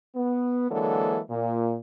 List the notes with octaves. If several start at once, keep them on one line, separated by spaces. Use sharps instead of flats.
B3
D3 E3 F#3 G#3 A#3 A4
A#2